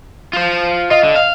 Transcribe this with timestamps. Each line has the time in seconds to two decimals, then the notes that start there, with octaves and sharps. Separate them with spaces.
0.33 F4 C5
0.91 F4 D#5
1.03 D3
1.16 F5